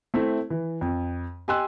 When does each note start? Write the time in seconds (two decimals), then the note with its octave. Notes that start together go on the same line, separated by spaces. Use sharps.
0.14 A3 C4 E4
0.50 E3
0.81 F2
1.48 G4 D#5 G#5 C6 E6 F#6